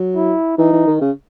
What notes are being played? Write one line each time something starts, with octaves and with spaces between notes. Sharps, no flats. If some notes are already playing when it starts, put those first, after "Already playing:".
Already playing: F#3
E4
E3 D#4
E3
D#3
C#3